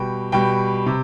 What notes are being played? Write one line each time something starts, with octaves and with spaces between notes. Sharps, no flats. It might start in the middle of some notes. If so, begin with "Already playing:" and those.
Already playing: B2 G3 G5
B2 G3 G5
C3